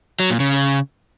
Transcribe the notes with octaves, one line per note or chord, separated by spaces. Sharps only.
F#3
A#2
C#3